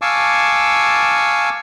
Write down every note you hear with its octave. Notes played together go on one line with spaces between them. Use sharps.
F5 G#5 A5 C#6 D6 E6